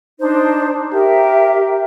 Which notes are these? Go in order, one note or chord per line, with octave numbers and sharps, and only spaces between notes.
D4 D#4 C5
G4 A#4 E5